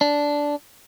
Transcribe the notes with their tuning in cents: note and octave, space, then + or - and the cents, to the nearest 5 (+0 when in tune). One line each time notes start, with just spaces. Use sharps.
D4 -10